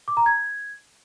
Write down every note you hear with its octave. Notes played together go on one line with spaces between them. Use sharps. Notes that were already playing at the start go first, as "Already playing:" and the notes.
D6
A#5
G#6